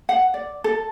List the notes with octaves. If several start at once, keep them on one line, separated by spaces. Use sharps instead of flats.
F#5
D5
A4